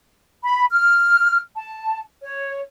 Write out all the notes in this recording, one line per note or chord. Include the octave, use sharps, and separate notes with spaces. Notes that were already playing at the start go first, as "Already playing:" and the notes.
B5
F6
A5
C#5